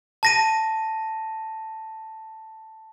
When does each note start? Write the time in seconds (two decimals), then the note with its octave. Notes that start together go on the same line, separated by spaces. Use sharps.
0.23 A5 A#6 D#7